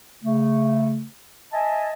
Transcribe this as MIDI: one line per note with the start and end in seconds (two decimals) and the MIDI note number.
0.24 1.04 49
0.24 1.04 57
1.53 1.93 75
1.53 1.93 76
1.53 1.93 80
1.53 1.93 81